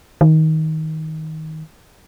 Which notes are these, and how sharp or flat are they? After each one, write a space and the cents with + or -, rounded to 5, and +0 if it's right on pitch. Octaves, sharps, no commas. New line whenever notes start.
D#3 +20